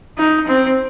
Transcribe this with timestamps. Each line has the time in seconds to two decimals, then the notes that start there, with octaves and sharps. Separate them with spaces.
0.18 D#4
0.47 C4